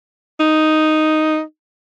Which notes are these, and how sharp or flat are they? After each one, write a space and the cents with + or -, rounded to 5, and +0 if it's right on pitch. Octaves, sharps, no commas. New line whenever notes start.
D#4 +0